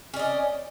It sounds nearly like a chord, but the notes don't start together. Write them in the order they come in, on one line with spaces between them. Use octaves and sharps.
C#4 D5 D#5